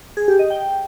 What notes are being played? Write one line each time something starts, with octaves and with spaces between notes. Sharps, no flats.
G#4
G4
D#5
G5